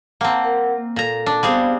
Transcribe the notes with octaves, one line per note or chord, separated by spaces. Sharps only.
A#3 C4 F#5 A5 A#5
A#4 F#5
A#3
A#2 A4 A#5
D4
G3 B3 C4 G#4 C5 F5